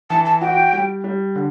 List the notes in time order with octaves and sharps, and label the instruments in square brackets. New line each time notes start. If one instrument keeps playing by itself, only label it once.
[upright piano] E3 [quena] A5
[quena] A5
[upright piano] F#4 [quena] G5
[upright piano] G3
G3
D3